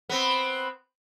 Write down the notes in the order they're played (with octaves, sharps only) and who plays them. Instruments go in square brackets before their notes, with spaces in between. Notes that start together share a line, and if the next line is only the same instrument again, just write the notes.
[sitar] B3 C4